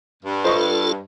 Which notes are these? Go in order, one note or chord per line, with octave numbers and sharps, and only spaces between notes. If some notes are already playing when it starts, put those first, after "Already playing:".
G2
F4 A4 C5 D#5 C#6